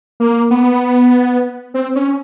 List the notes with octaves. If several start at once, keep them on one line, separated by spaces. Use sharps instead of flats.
A#3
B3
C4
C#4